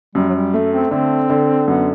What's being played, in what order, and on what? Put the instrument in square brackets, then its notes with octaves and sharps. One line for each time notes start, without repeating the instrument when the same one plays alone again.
[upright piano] F#2 [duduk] G3
[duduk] F#3
G3
[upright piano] A3
[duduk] C4
[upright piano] D3 [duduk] C4
[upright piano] D3
[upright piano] F#2 [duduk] B3